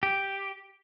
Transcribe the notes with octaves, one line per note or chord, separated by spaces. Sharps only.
G4